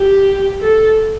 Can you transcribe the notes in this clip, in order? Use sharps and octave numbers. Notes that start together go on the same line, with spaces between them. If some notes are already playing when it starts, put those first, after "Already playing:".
Already playing: G4
A4